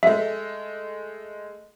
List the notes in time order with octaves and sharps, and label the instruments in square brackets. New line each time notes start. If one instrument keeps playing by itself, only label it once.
[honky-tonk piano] G#3 A3 [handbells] E5